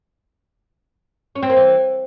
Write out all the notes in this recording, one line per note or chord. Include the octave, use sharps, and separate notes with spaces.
C#4
C4
A#3
E3